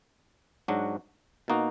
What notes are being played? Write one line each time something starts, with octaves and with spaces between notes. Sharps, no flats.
G#2 F#3 D4 F#4
B2 A#3 D#4 F#4